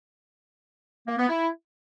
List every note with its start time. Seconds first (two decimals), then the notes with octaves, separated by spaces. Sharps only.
1.07 A#3
1.18 B3
1.28 E4